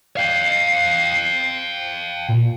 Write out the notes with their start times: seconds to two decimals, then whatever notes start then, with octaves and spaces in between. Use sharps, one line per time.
0.17 F5 G5 C7
2.29 A#2